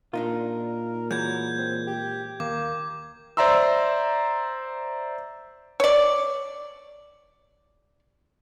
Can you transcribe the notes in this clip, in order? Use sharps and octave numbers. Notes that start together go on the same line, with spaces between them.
A#2 D4 D#4 F4 A#4
E3 F#3 G#3 G6 G#6
C4
G4
D#2 A#3 D6
C5 D5 E5 A#5 C6 E6
C#5 D5